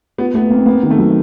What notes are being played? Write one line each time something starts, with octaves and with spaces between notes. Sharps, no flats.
B3 F4
A3 B3
A#3 C4
A#3 B3
D#3
A3
F#3